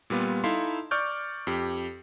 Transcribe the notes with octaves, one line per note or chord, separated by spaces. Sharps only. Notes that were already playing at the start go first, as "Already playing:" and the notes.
A#2 G3 B3 F4
D#4 E4 A4 E5 F5 C6
D5 C#6 D6 F6 G6
F2 G4